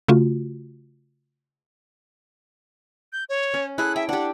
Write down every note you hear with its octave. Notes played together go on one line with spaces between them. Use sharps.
C#3 A3 F4 F#4
G6
C#5
C#4
E4 G#4 A4 F#6
E5 G5
D4 G4 F#5